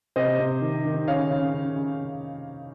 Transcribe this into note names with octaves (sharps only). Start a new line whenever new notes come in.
C3 C5 D#5
C3
D#3
D#3
C#3 C#5 F5
C#3
C#3
C#3